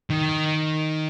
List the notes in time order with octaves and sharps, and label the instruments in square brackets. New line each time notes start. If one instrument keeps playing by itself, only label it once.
[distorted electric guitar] D#3